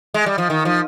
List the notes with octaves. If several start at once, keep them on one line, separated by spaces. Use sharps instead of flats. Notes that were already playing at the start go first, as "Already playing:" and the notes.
G#3
G3
F3
D#3
F3